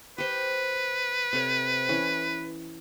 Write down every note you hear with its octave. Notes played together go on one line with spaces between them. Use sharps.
G4 B4 C5
C3 A4 C#5
E3 C#4